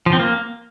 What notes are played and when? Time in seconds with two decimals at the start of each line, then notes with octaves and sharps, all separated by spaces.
0.06 F3
0.13 C4
0.20 A#3